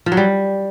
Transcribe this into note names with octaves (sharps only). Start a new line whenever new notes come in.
F3
F#3
G3